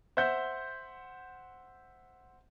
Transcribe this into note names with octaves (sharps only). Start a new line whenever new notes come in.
C5 E5 F#5 G6